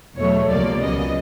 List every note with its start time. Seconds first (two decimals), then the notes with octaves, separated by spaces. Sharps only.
0.16 E2 B2 F#3 A3 C#5
0.49 C#2 C3 F3 A#3 D5
0.81 C#2 C#3 F#3 B3 D#5